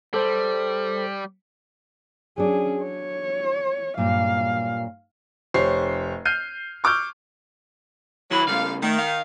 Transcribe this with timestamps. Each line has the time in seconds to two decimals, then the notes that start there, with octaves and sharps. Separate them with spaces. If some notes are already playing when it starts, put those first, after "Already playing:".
0.14 G3 A4 C5
2.38 F#3 C#4 D4 G#4
2.83 C#5
3.97 G2 A#2 F#3 F5
5.54 F1 G4 C5 C#5 C7
6.25 F6 G6 C7 D#7
6.84 C#6 D6 E6 F6 G6
8.31 D#3 F#3 E4 B5
8.47 C#3 G3 A3 A#3 F5
8.82 D#3 A3
8.99 F5